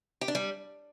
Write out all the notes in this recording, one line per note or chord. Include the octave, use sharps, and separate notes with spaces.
G4
D4
G3